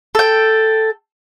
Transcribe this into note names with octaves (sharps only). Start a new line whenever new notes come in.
A4 G5